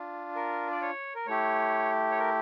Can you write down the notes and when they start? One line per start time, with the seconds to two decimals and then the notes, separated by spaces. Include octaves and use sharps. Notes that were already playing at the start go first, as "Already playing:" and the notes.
Already playing: D4 F4
0.35 A#4
0.71 D5
0.81 C#5
1.15 A#4
1.27 A3 E4 G4 C#5
2.11 C#5
2.19 A#4